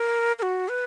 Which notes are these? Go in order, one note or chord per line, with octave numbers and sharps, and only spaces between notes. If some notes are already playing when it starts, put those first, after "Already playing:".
Already playing: A#4
A#4
F#4
B4